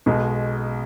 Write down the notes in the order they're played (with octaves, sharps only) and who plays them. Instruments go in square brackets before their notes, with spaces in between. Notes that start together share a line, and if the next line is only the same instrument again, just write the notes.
[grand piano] B1 B2 G#3